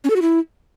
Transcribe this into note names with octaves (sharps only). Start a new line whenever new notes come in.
C#4
A4
F#4
E4